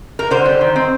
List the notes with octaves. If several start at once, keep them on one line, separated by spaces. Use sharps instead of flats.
A#4
D3 C5
G3
D#3
C4